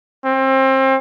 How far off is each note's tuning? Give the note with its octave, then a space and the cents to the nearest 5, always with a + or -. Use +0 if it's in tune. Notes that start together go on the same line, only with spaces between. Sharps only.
C4 +30